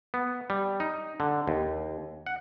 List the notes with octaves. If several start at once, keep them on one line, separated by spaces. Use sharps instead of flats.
B3
G3
D#4
D3
D#2
F#5